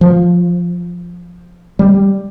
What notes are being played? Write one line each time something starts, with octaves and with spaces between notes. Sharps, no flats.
F3
G3